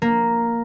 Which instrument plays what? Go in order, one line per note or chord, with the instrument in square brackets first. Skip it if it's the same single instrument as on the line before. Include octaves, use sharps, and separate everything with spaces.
[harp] A#3